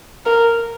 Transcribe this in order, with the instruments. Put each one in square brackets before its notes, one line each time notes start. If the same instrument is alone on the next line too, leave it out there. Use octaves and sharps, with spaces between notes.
[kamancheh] A#4